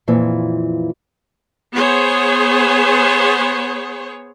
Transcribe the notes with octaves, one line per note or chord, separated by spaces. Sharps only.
F2 A#2 E3
B3 G#4 C5 C#5